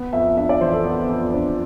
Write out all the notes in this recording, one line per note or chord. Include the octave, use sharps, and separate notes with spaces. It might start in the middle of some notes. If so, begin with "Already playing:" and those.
Already playing: B3
F2 E5
D4 E5
D5
E3 C5
A4
B3
F2
D4 C5